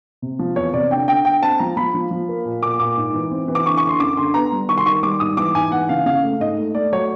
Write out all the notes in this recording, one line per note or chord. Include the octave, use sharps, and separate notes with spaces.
C3
F3
E2 C#5
C3 D5
D3 G5
D3 G5
D3 G5
C4 A5
F3 A#5
F3 B5
F3
F3
A#3
A#2
A#2 D6
A#2 D6
G#2
E3
C4
E3
D6
D3 C#6
C#6
D3
C6
F#2 D6
D3 C6
B3 A#5
G3
D#3 C#6
C6
D#3 C#6
G3 D6
G#2 D#6
E3 D6
G#2 G#5
E3 F#5
C#3 F5
C#3 F5
A3
G#2 D#5
A3
A3 D5
F#3 C#5